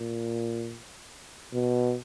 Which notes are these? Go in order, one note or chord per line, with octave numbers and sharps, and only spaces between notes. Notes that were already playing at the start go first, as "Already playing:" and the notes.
Already playing: A#2
B2